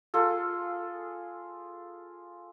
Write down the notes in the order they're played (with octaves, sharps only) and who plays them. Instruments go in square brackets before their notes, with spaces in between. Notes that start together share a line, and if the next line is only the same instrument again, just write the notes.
[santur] F4 G#4 A4